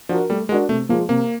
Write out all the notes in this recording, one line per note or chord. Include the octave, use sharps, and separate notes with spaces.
F3 D4 F#4 A#4
G3 A3
G#3 D4 F#4 A#4
C3 A3
F3 G#3 A#3
C3 A#3